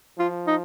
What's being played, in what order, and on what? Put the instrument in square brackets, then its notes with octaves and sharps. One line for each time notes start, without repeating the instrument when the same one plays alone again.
[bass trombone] F3 [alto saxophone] F4
[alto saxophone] D#4